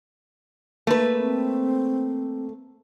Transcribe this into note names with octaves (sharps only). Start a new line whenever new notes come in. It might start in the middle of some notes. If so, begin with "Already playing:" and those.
A3 A#3 B4
C4